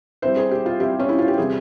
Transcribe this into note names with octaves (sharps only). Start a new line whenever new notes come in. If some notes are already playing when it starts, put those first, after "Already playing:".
G3 C4 E4 C5
G#4
G4
F4
G3 C4 E4 G4
C#4
E4
F4
G4
C3 E3 G3 C4 E4 G#4